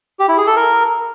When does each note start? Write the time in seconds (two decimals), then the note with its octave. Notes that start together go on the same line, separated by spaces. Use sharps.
0.19 G4
0.29 E4
0.38 G#4
0.47 A4
0.56 A#4